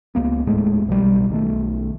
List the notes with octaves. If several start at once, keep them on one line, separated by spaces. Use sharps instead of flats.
C#2 G2 A#3 B3
D#1 A2 G#3 A3
B1 B2 F3 G3
B1 D#3 A3